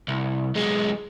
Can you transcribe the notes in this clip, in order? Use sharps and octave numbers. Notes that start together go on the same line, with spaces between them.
C2
B1 G#3